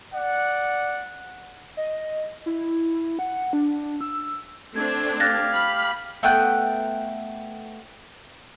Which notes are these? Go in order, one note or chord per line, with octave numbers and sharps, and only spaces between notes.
D5 F#5
D#5
E4
F#5
D4
E6
A3 C4 D4 G#6
G4 F5 F#6 A6 A#6
B5 F6
A3 B3 G5 F#6